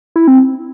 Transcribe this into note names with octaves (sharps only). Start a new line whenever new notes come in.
E4
C4